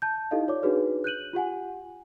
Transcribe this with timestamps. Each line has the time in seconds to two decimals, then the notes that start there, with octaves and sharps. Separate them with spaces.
0.02 A5 G6
0.31 D#4 E4 G4 A4 D#5 F5
0.48 F4 C#5 D5 D6
0.62 D4 D#4 F#4 G#4 B4 C#5
1.04 F#6 G6 D#7 F#7
1.33 F4 G4 F#5 G#5